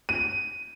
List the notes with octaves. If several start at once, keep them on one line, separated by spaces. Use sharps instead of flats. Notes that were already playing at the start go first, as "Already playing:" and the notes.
D#7